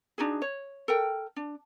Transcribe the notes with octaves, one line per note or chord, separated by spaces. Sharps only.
D4 D#4 F#4 G#4
C#5
A4 A#4 G5
D4